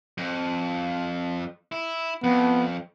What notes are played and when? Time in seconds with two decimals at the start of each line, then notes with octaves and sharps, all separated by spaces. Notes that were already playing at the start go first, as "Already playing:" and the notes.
0.18 F2
1.72 E4
2.24 F2 B3